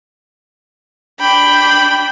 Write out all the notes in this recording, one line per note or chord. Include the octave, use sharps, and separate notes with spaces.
D4 G5 B5